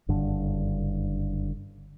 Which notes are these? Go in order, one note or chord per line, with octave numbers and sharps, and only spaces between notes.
F#1 G2 D3